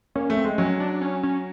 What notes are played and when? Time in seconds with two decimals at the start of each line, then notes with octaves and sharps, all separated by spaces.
0.15 A#3 C#4
0.30 A3
0.37 C4
0.44 G#3
0.58 F#3 C#4
0.80 D4
1.01 C#4
1.23 C#4